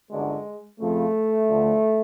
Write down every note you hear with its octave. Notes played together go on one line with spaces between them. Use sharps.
G1 F#2 D3 G#3
F2 C#3 F3 A3
D2 D3 F3